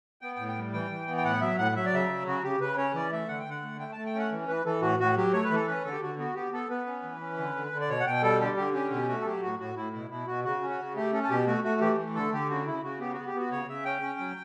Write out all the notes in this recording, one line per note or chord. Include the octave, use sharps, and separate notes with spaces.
B3 G5
A2 G5
G5
G3
E3 G5
E3
B3
G5
A2 F#5
F#3 E5
A2 F#5
F#3 E5
D5
C#3 E5
F#3
C#3 F#4
C#3 G4
C#3 B4
C#4 C#5
E3 D5
A3 E5
D3 F#5
G5
D3 F#5
A3
A3 G5
A3 A5
G5
C#4 F#5
E3
E3 B4
E3 A4
A2 F#4
A2 F#4
F#3 G4
A3 C#5
B4
E3 A4
C#4 B4
D3 A4
G4
D3 F#4
B3 F#4
B3 G4
B3 A4
B3 B4
C#4
E3
C#4
D3
D3
D3
D5
B2 C#5
F#5
B2 G5
G3 A4
D3 G4
D3 G4
C#4 G4
B2 G4
A3 F#4
A4
F#3 G4
A2 F#4
A2 F#4
A2 E4
B2 E4
B2 E4
B2 F#4
C#3 F#4
C#4
F#4
C#3
A3 G4
C#4 A4
A4
B2 G4
A3 F#4
A3 F#4
E3 G4
A3
D3 A4
D3 G4
C#3 F#4
C#3 E4
C#3 F#4
B3 G4
B3 F#4
G4
B3 F#4
C#3 C#5
C#3 E5
C#4 G5
C#4
F#3